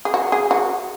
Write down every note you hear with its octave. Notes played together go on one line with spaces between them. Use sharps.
G#4
F#4
G#4
F#4